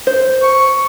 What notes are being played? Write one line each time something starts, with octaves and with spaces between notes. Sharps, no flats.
C5
C#6